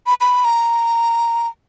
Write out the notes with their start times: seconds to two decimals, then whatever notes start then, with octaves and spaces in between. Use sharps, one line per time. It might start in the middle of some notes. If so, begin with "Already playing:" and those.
0.06 B5
0.21 B5
0.45 A#5